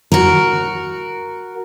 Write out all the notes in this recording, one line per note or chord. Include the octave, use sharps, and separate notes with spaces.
F#4 A#4